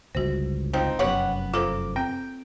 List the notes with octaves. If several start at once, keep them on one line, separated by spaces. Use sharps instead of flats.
G1 C#2 G2 F#4 C5
F3 C4 D#4 G5
F1 F#2 B3 G4 C#5 F#5
A#3 F4 A4 C5 D6
C4 G5